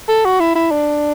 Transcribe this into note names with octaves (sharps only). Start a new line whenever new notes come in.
A4
F#4
E4
E4
D4